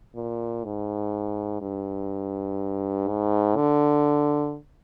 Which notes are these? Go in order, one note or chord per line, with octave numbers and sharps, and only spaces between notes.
A#2
G#2
G2
G#2
D3